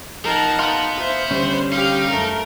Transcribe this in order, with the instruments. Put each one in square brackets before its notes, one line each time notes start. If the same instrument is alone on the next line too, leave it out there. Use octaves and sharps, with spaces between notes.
[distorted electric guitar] F3 [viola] D#4 [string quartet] A#4 F#5 A5
[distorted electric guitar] B3 [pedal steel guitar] F5 C6
[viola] C5 [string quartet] E5
[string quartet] D3 [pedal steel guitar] G3 C#4
[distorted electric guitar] D#4 [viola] G4 F5
[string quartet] F#2 A3 [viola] A#4